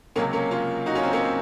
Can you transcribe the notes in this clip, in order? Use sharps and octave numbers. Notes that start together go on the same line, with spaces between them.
C#2 C3 F#3 A#3 C#4
A#3 C#4
C#4 F4
D#4 F#4
C#4 F4
C4 D#4
A#3 C#4
C4